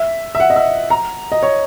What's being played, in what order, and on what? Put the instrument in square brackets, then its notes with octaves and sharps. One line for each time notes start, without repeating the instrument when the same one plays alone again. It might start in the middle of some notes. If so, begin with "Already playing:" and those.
Already playing: [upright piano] E5
E5
F#5
D#5
E5
A#5
D#5
C#5